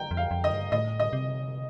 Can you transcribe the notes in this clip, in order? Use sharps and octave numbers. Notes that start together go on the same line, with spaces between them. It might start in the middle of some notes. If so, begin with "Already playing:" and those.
Already playing: G5 A#5
F2
F5
F2
D#5
G2
A2 D#5
D#5
C3